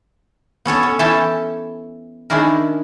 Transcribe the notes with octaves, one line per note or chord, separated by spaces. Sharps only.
B3 C#4 A4 C#5
C#4
E3 C#4 E4 A4 G5 A5
D#3 G#3 C#4 D4 E4 A#4